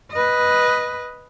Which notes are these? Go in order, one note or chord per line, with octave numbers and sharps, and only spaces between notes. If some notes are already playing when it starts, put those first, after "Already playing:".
B4 D#5